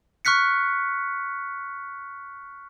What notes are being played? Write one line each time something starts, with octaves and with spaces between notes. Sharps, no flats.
C#6 F6 F#6 B6 C#7